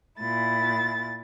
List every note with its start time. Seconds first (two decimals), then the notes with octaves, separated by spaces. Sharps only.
0.18 A#2 E4 A6